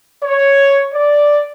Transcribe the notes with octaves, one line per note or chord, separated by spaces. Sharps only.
C#5
D5